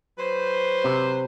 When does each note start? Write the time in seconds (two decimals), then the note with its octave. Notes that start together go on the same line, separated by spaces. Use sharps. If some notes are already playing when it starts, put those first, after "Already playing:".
0.18 F#3 B4 C5
0.84 C3